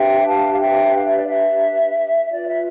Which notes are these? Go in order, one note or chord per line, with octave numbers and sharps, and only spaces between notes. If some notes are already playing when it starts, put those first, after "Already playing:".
Already playing: D4 G4 B4 E5 G5
F5 A5
F5
E5 G5
F5
E5
D5
E5
E5
F4 B4 D5
E5